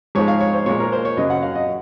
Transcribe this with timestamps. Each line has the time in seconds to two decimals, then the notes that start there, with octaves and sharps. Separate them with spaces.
0.15 G#2 F3 G#3 C#5
0.28 F5
0.40 C#5
0.54 C5
0.66 A#2 G#3 C#5
0.80 A#4
0.93 C5
1.05 C#5
1.17 F#2 C#3 F#3 D#5
1.30 F#5
1.42 F5
1.55 D#5